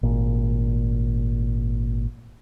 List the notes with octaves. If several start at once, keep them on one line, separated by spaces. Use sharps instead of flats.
G#1 A#2